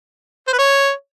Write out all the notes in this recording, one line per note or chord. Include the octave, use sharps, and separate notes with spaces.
C5
B4
C#5